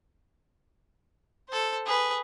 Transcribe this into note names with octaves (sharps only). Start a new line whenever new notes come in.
A4 C5
G#4 B4